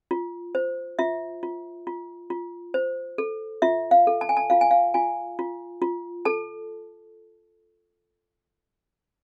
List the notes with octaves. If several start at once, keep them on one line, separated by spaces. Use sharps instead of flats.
F4
C5
F4 E5
F4
F4
F4
C5
A4
F4 E5
F5
A4
A5
G#5
A5
F4 F5
G#5
F5
F4 G#5
F4
F4
A4 A5